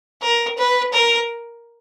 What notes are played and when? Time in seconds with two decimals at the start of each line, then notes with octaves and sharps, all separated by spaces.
0.22 A#4
0.58 B4
0.93 A#4